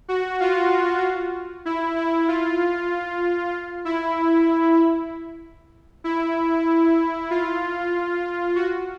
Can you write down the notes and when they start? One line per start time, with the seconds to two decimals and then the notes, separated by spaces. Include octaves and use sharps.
0.08 F#4
0.40 F4
1.65 E4
1.97 E4
2.28 F4
3.85 E4
6.04 E4
7.31 F4
8.56 F#4